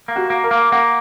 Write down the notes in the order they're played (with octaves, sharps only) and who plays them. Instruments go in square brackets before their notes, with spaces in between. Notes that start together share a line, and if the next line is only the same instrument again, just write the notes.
[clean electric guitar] A#3
[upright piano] F#4
[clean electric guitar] A#3
[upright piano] A#4
[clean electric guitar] A#3
[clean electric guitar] A#3 [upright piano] F#5